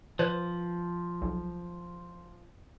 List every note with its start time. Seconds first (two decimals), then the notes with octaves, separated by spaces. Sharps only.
0.19 F3 B4 C5
1.22 B1